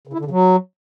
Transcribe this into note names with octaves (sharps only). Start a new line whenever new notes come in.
C#3
E4
D3
C#3
F#3